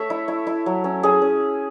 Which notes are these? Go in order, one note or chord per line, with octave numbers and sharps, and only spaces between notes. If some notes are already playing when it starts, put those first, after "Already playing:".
Already playing: A3 C#5 E5
E4
E4
E4
F#3
C#4
C#4 G#4
C#4